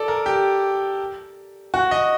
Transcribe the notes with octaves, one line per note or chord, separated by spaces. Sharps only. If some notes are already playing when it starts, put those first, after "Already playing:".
Already playing: A4 D5
A#4
G4
F#4
D#5